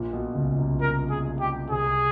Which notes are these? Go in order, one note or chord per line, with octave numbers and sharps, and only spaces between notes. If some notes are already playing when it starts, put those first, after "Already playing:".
Already playing: A#1 A#2
B1 B2
C#2 C#3
C2 C3
A#4
G#4
G4
C2 C3 G#4